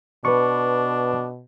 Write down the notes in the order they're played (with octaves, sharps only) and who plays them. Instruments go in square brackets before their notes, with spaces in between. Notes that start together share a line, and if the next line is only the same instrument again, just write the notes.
[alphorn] B2 [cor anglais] D4 [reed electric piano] B4 C#6